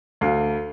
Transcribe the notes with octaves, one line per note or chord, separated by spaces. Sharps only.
D2 F5